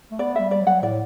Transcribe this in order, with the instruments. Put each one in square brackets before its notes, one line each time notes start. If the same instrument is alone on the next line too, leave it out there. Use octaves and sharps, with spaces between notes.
[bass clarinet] A3
[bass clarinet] B3 [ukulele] D5
[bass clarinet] G3 [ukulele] E5
[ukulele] D5
[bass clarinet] F#3
[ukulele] F#5
[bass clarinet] A2 [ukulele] D5